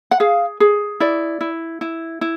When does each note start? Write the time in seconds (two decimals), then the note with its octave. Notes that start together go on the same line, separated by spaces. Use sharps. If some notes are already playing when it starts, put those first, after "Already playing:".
0.11 F#5
0.20 G#4 F5
0.60 G#4
1.00 E4 D5
1.41 E4
1.81 E4
2.21 E4